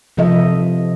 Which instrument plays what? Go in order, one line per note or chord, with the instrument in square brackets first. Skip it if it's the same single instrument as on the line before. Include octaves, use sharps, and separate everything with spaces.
[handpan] C3 F3 A4 D#5 E5